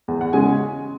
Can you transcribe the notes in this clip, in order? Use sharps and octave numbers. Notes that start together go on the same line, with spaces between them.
E2
F#5
C#3 G#3 G#5